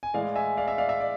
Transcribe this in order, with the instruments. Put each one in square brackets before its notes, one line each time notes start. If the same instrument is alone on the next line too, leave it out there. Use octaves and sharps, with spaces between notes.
[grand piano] G#5
A2 E3 G#3 D5 F5
E5 G#5
D5 F5
E5
D5 F5
E5
D5